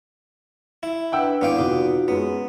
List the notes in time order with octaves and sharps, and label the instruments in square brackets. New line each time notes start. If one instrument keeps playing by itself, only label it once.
[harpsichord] E4
[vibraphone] D4 B4 [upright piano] F#5 G5 E6
[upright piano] G#1 [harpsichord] B3 F5 G5 [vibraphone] E4 D6
[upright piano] F1 [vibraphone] D#4 F4 F#4
[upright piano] F#2 G#3 [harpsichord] B3